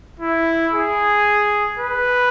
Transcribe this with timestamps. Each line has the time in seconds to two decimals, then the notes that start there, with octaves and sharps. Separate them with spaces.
0.20 E4
0.73 G#4
1.79 B4